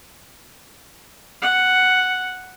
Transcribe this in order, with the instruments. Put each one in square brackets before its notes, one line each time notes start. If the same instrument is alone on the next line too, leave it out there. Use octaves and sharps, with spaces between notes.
[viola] F#5